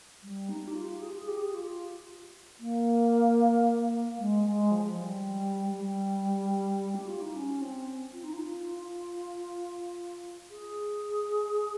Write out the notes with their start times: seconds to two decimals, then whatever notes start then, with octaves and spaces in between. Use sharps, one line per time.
0.23 G3
0.49 D#4
0.67 G4
0.74 F4
0.95 G4
1.01 G#4
1.28 G4
1.47 G4
1.54 F4
2.59 A#3
4.18 G#3
4.44 G#3
4.71 F3
4.97 G3
5.75 G3
6.94 G4
7.07 F4
7.21 D#4
7.34 C#4
7.61 C4
8.12 F4
8.23 D#4
8.33 F4
10.50 G#4